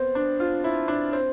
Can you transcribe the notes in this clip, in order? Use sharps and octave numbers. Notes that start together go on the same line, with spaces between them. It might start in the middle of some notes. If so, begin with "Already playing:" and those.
Already playing: B3 C4
D4
F4
E4
D4
C4